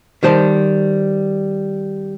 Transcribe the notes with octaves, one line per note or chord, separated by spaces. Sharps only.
D#3 G3 C5 A5